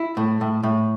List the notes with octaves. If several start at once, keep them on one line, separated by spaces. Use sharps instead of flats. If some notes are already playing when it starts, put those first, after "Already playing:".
Already playing: E4
A2
A2
A2